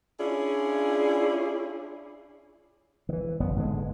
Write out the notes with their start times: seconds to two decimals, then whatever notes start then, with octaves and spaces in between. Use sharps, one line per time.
0.19 C#4 D4 E4 F4 G#4
3.09 D#3 E3
3.40 F#1 B3
3.56 G#2 D3 G#3